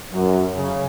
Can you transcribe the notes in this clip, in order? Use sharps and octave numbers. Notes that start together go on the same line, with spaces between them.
F#2
C#3